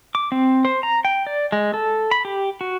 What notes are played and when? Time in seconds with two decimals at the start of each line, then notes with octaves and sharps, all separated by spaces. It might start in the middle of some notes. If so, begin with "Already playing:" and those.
0.15 D6
0.32 C4
0.65 C5
0.83 A#5
1.05 G5
1.27 D5
1.52 G#3
1.74 A4
2.11 B5
2.25 G4
2.61 F#4